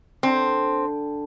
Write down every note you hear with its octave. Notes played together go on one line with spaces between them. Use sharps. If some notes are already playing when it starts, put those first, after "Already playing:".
D3 C4 A5